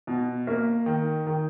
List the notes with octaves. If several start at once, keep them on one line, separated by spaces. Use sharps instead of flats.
B2
A#3
D#3
D#3